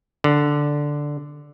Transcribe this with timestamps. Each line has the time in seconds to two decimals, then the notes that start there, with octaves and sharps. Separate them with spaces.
0.24 D3